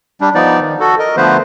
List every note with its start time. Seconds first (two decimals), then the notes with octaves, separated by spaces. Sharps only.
0.21 G3 D4
0.35 F3 B3 D#4 D5
0.60 D#3
0.80 F#4 A4
0.99 A#4 D#5
1.17 D3 F3 A3 B3 B4 C5